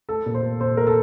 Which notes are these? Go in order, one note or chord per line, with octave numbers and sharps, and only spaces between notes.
A3 A4
A#2
C5
A3
A#2 C5
A3 A#4
A4